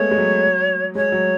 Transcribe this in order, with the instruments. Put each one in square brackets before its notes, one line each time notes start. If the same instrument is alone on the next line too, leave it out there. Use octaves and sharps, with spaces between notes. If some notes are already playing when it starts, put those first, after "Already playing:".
Already playing: [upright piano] G#3 A3 B3 [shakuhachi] C#5
[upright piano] G#3
F#3
[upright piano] G#3 [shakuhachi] C#5
[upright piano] F#3